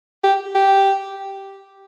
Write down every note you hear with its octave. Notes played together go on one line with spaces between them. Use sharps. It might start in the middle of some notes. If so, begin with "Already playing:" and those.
G4
G4